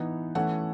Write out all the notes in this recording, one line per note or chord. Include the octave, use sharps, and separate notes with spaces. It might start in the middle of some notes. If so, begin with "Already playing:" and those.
Already playing: E3 B3 D#4
E3 A3 C#4 F#5